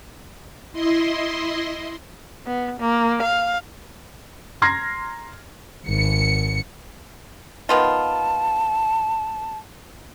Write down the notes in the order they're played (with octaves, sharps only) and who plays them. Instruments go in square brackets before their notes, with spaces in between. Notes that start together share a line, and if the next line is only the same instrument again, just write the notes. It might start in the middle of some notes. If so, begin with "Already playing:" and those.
[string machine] E4 D#5 C6
[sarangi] B3
A#3
F5
[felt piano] A#5 C6 F6 G#6 A#6 C7
[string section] G#1 C#7
[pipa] D#3 B3 F4 [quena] A5